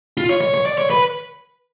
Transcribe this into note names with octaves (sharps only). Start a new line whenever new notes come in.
F4
C#5
C#5
C#5
D5
C#5
B4